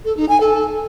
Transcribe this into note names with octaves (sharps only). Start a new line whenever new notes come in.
A4
D#4
G#5
A4